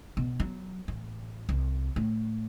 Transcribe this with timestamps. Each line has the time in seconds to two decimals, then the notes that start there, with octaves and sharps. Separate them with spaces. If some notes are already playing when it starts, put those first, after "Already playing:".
0.17 B2
0.40 F#3
0.88 A1
1.49 C2
1.96 A2